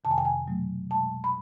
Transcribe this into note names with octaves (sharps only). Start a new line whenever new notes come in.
F2 C3 D#3 A5
G#5
G5
G#5
B2 F#3 A3
B2 G#3 A5
B5